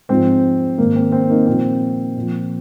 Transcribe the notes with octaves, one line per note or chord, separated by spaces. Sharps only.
G#2 F3 C4
G#2 D#3 A#3
C4
C4
A#3 D#4
A#2 F3 C4
A#2 F3